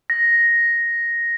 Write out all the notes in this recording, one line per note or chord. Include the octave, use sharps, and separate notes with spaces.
A#6